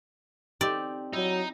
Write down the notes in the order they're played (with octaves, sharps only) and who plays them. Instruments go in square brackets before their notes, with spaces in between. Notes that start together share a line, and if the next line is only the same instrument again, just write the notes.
[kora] C4 D#4 G4 [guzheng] D5
[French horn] F#3 [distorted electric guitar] D#4 [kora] E4